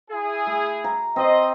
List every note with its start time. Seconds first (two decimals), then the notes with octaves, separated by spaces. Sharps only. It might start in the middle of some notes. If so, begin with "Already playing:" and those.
0.11 E4 G#4
0.47 A3
0.84 A#5
1.16 C4 C5 D#5 C6